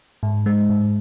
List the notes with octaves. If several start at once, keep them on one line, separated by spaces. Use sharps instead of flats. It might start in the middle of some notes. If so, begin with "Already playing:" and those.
G#2
G#3
G#2